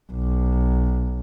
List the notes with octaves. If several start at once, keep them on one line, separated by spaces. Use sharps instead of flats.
B1